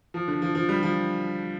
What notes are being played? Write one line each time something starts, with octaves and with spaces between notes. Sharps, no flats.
F3
D3
F3
F3
G3
F3